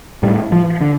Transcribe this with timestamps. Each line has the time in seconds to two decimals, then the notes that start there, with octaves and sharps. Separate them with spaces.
0.23 A2 G3
0.52 F3
0.81 D3